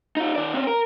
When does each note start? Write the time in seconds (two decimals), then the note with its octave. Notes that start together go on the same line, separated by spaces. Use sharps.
0.17 D#4 F4
0.36 D#3 D5
0.54 C4 C#4
0.67 A#4